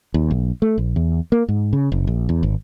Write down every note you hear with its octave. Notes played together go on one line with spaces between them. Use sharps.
D#2
B1
A3
A#1
E2
A#3
G#2
C#3
F#1
A#1
E2
G#1